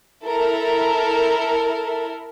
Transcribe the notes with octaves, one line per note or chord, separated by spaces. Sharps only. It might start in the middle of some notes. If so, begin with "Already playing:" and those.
E4 A4 A#4